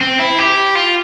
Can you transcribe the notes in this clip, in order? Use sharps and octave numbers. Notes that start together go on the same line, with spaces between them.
C4
E4
G4
F4